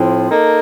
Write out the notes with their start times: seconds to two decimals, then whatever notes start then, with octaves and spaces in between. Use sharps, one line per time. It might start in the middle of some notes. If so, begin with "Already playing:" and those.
Already playing: A2 F3 C4
0.29 A#3 D#4 A4